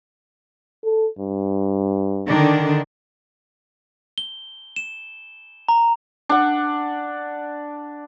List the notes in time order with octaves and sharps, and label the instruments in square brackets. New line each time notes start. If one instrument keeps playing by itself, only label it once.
[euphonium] A4
G2
[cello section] D3 D#3 D4
[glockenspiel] G7
E7
A#5
[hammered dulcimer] D4 F#5